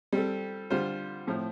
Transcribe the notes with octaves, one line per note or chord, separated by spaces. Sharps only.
G3 C4 A4
D3 G3 F4 C5
A2 F3 C4